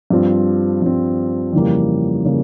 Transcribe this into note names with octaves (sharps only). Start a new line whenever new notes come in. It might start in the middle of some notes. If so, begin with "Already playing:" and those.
G2 F3 C4
G2 F3 C4
F2 C#3 E3 G3 A#3
C#3 E3 G3 A#3